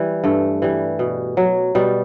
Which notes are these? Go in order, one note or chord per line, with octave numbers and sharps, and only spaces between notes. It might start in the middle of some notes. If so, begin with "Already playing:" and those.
Already playing: E3 G3
G2 A3
E3 G3
B2
F#3
B2 G3